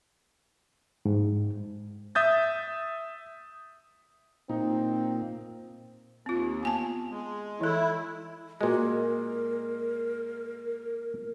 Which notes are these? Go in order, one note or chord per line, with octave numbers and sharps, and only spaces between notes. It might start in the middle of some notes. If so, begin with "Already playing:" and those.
G#2
E5 D#6 G6 A6
A#2 C4 D#4
D#2 C4 F4
B3 G#5 A5
G#3
E3 E4 A4
A#2 G#3 F#4
A#4